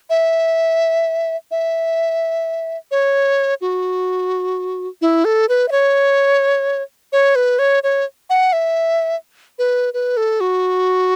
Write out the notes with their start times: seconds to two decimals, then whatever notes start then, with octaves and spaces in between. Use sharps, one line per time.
0.10 E5
1.51 E5
2.91 C#5
3.61 F#4
5.01 E4
5.25 A4
5.49 B4
5.68 E5
5.72 C#5
7.12 C#5
7.36 B4
7.59 C#5
7.83 C#5
8.30 F#5
8.53 E5
9.59 B4
9.94 B4
10.17 A4
10.41 F#4